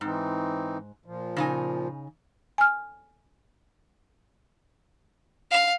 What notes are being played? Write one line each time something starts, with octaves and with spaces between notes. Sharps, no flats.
G#2 E3 C4 D#4
A#2 F3
C#3 D#4 G#5
G#5 F6
F5